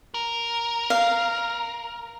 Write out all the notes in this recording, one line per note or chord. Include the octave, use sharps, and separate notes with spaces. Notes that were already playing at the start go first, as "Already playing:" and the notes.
A#4
F5